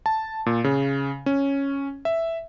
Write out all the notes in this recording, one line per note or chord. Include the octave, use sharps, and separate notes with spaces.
A5
A#2
C#3
C#4
E5